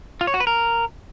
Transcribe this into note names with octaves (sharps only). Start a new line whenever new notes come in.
F4
C#5
F#4
B4
A#4